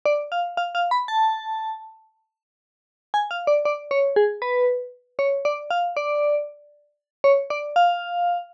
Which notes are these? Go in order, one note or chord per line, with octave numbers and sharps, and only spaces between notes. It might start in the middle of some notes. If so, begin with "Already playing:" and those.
D5
F5
F5
F5
B5
A5
G#5
F5
D5
D5
C#5
G#4
B4
C#5
D5
F5
D5
C#5
D5
F5